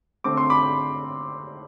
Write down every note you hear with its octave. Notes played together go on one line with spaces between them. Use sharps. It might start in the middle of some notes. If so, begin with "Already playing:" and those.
D3 A3 C4 D6
C6
B5 D6